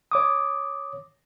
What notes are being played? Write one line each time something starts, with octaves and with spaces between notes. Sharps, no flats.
C#5 D6 D#6